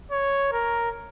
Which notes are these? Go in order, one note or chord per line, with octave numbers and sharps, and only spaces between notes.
C#5
A#4